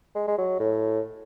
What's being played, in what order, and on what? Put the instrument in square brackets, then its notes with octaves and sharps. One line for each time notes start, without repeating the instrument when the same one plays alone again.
[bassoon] G#3
G#3
F#3
A2